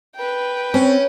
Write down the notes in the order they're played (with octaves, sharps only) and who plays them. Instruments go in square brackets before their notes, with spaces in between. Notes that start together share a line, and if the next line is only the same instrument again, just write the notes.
[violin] B4 G5
[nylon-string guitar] C4 [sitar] C#4